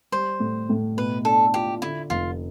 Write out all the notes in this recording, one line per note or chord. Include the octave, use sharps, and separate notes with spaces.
G3 C5
A2
A2
B2 B4
D4 A4
F4 G4
D3 E4
F1 F4